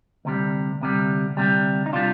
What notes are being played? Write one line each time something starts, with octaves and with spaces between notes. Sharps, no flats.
D2 C3 G3
D2 C3 G3
D2 C3 G3
D#4
C3 G3 D4 F4